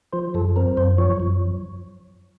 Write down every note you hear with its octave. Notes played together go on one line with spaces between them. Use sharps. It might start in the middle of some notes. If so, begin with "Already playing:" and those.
F3 C5
F#2 A4
C4 A#4
F#2 C5
F3 C#5
F#2